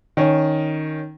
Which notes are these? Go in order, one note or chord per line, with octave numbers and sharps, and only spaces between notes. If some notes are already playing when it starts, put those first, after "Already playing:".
D#3 C#4